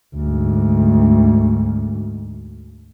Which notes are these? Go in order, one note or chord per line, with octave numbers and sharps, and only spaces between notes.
D2 G#2